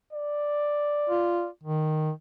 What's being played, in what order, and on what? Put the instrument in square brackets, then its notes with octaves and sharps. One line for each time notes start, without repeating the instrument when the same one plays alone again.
[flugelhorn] D5
[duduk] F4
D#3